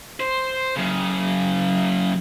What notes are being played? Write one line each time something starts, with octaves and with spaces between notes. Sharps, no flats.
C5
F#2 C#3